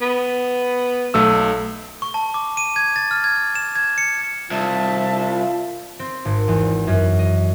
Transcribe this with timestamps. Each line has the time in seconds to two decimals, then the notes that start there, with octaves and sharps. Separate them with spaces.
0.02 B3
1.14 B1 A3 E6
2.02 C#6
2.14 A5
2.34 D6
2.57 D#7
2.76 G#6
2.96 A6
3.11 F6
3.24 G#6
3.55 E7
3.75 G#6
3.98 C#7
4.51 C2 F4 E5 A5
5.99 C4
6.25 G#1
6.48 E2
6.87 F#2
7.19 D#5